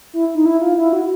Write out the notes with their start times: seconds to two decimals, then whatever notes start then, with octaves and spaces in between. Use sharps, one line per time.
0.13 E4
0.35 D#4
0.46 E4
0.61 F4
0.77 E4
0.93 F#4